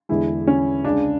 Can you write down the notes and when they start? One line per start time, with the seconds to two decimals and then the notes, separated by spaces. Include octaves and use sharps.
0.09 E2 D3 G#3 E4
0.47 C#4
0.85 C#2 C#3 G#3 D4